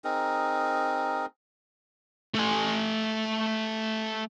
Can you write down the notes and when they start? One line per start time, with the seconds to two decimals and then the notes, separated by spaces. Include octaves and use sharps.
0.04 C4 D#4 G#4 A#4
2.34 A3 G#5